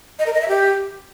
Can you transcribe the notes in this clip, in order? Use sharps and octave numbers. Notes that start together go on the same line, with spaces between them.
D#5
A#4
D#5
E5
G4